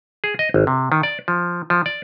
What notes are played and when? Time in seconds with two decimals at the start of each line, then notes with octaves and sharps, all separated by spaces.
0.24 G#4
0.39 D#5
0.54 G#1
0.67 C3
0.92 D#3
1.03 D5
1.28 F3
1.70 F3
1.86 D5